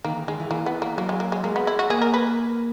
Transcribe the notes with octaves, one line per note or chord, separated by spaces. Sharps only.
D#3 A#3
E3
D#3 G#3
E3
E3 A#3
B3
A#3
F#3 A#3
G#3
A#3
G#3
G#3 A#3
B3
E4
F#4
A#3 G#4
A#4
B4